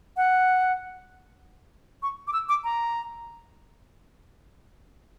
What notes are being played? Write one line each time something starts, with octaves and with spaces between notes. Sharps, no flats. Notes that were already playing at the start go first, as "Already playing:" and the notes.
F#5
C#6
D6
E6
D6
A#5